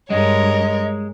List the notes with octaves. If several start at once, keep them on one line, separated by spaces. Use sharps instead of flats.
G2 G#3 A#4 C#5 D#5